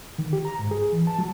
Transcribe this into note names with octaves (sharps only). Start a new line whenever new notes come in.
D#3
G4
A#5
G#2
G#4
E3
A5
F#3